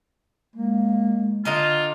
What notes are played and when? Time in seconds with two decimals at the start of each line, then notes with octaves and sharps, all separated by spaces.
0.56 G#3 A#3
1.45 D3 F4 D#5 A#5